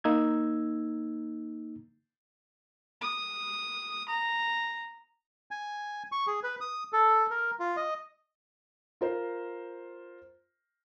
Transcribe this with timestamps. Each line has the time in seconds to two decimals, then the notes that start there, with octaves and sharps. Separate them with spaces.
0.04 A#3 D#4 E6 G#6
3.01 D#6
4.09 A#5
5.51 G#5
6.12 C#6
6.27 G#4
6.43 B4
6.61 D#6
6.93 A4
7.31 A#4
7.60 F4
7.77 D#5
9.01 F4 A#4 C5